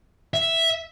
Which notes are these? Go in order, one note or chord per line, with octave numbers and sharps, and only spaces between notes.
E5